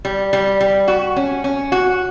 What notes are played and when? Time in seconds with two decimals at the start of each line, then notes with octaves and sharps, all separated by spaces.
0.05 G3
0.33 G3
0.61 G3
0.88 F#4
1.16 C#4
1.44 C#4
1.72 F#4